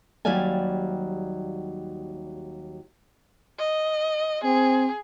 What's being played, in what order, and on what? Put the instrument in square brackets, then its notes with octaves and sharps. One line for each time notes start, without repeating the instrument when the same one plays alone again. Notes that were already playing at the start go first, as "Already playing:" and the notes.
[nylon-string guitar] D#2 F#3 G3 D5 F5 G#5
[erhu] D#5
[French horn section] C4 [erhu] G#4